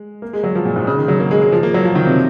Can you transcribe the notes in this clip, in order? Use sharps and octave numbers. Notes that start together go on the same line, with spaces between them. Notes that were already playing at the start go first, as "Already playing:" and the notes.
Already playing: G#3
A#3
G#3
F#3
F3
A#2
G#2
C#3
D#3
F#3
A#3
G#3
G#3
F3
A#3
F#3
F3
D#3
C3